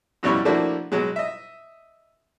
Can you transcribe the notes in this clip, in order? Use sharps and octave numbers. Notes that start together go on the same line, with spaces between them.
F2 B2 G3 C#4 E4 C#6
F3 A3 A#3 D4 E4 F#4
B2 F#3 G#3
D#5 E5